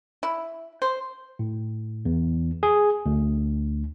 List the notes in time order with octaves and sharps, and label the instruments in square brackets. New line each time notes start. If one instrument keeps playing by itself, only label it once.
[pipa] E4
C5
[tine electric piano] A2
E2
G#4
D2